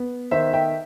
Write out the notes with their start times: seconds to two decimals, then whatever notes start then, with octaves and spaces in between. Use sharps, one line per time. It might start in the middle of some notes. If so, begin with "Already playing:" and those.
Already playing: B3
0.31 D#3 C5 E5
0.53 E5 G5